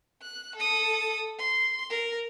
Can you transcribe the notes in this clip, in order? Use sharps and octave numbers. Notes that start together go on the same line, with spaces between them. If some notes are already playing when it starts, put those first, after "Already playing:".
F#6
A4 D#6
C6
A#4